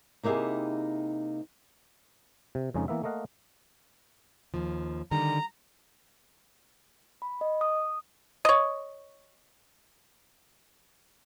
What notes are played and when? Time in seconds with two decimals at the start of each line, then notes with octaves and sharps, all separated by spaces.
0.23 C3 A#3 D#4 E4 G4 G#4
2.55 C3
2.74 F2 C#3 G#3 C#4 D#4
2.88 E3 A#3 B3 E5
3.03 A3 A#3 D#5 F5 F#5
4.54 D#2 F3
5.11 D3 D#3 G3 A#5
7.22 B5
7.41 D#5
7.61 D#6
8.45 C#5 D#5